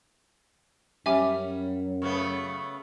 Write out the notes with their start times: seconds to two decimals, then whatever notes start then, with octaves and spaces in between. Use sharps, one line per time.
1.06 F#2 G3 C#4 G4 E5 G#5 D6
2.02 C#3 A3 B3 C#5